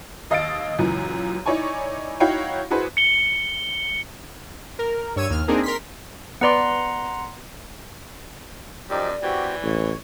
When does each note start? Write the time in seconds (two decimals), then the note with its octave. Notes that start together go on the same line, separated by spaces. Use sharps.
0.30 D#2 D#5 F5 E6 A6 D7
0.79 C#2 F#2 A#2 E3
1.46 D#4 E4 C#5 D5 G#5 C#6
2.20 D#4 E4 F#4 C#5 F5 G5
2.70 D4 E4 F#4 G#4 B4 C5
2.97 C#7 G7
4.79 A#4
5.16 G2 C#5 E6 G#6 D#7
5.30 D#2 F6
5.48 A#3 C4 D4 D#4 G#4 A#4
5.63 A#4 C6 B6
6.41 B3 B4 D5 F#5 A#5 C6
8.90 F#2 F3 D#4 G4 D5
9.23 E3 C4 F#4 G4
9.63 A1 C#5